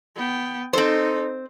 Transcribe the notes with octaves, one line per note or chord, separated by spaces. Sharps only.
B3 G5
C4 D#4 A4 C5